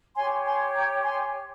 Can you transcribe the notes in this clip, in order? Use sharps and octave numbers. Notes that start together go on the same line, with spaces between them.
G4 C#5 G#5 C6
G#5 C6
G5 A#5
G#5 C6